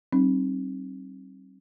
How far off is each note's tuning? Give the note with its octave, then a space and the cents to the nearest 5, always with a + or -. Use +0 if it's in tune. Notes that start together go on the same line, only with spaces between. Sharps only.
G3 -35 C4 +40 D#4 +0